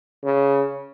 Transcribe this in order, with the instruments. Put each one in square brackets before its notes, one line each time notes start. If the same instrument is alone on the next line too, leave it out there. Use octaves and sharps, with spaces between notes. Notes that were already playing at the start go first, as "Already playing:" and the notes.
[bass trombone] C#3